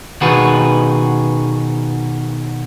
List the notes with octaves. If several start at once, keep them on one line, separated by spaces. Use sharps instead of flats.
B2 D#3 F#4 G#4 B4